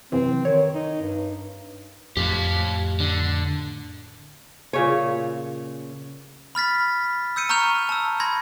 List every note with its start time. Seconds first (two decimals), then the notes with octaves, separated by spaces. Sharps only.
0.12 F#2 C3 E3 C4
0.45 D#3 C#5
0.74 D#4
1.01 G2
2.17 F2 A2 G4 F5
3.00 D3
4.73 A#2 C#3 C#5
6.55 B5 F6 A6 B6
7.36 E6 G6 C#7 D#7
7.49 A#5 C#6 F6 G6 F7
7.89 A5 E6
8.20 B5 C6 G#6 A#6